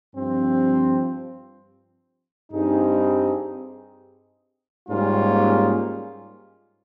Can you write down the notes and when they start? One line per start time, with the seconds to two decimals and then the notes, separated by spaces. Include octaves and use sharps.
0.13 G2 F3 C4
2.50 G2 G3 C4 D#4 G#4
4.88 G#2 G3 A#3 C#4 F4